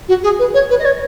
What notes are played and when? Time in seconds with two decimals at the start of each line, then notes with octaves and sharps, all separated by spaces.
0.08 F#4
0.23 G#4
0.39 B4
0.54 C#5
0.69 B4
0.79 D#5
0.85 C#5